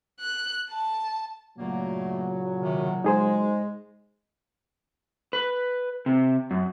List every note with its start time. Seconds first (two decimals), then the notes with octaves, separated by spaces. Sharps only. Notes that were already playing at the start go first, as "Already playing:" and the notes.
0.20 F#6
0.70 A5
1.58 G2 A#2 C#3 F#3 A3 A#3
2.61 D#2 C3 D#3
3.04 G#3 D#4 G#4 C5
5.33 B4
6.06 C3
6.51 F#2